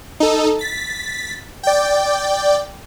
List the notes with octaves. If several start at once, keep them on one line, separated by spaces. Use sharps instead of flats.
D#4 A4
A6 B6
D5 G5